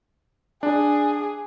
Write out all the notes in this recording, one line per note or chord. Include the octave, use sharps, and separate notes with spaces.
D4 G#4